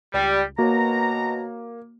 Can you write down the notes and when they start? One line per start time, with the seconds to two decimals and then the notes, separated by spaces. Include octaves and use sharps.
0.14 C#2 G3
0.58 B2 A#3 F#4 C#5 A#5